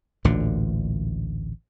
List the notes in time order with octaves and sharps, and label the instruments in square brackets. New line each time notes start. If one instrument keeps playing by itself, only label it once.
[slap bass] A1 D2 A#2 D3